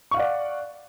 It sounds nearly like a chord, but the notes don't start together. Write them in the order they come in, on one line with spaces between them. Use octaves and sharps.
C#6 F5 F#5 D5